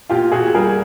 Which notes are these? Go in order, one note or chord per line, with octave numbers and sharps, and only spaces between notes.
A#2 F4 G4
A#2 F#4 G#4
G3 G#4 A#4